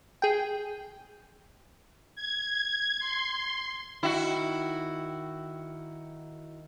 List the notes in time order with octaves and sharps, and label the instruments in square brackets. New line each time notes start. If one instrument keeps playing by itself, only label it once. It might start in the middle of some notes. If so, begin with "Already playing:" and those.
[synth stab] G#4 G5
[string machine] G#6
C6
[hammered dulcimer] D#3 [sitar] E4 F#4